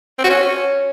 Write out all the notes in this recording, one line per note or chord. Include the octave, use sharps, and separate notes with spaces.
C4
F#4
C#4